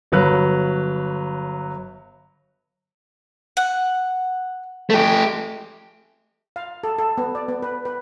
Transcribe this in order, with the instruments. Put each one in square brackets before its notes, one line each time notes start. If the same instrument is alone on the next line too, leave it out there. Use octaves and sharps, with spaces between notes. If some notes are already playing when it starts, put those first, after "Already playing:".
[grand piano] G1 F#3 B4 F#6
[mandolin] F#5
[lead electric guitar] A3 G4
[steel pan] F5
A4
A4
B3
D5
B3
B4
B4